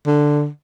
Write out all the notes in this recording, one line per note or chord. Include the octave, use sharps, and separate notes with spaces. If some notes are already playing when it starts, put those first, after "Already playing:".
D3